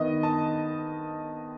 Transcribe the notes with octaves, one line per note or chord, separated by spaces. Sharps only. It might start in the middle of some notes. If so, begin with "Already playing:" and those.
Already playing: D#3 B3 D#5
A5